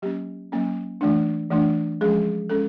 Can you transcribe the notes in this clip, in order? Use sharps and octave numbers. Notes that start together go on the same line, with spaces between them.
F#3 A#3 C#4 G4
F#3 A#3 C#4
E3 A3 D4
E3 A3 D4
F3 G#3 C#4 G#4
G#3 C#4 A4